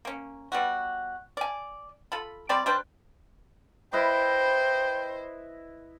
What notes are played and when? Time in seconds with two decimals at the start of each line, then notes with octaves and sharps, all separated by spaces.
0.05 A#3 C#4
0.52 G3 B3 F#4
1.37 D5 G#5
2.12 F4 A4 B5
2.49 G3 C4 D5 B5
2.66 G3 D4 B4 C5
3.93 E4 B4 C5 D#5 G5